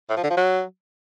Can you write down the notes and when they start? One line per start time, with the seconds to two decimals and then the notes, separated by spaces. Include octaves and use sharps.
0.10 A2
0.17 F3
0.23 D3
0.30 F3
0.37 F#3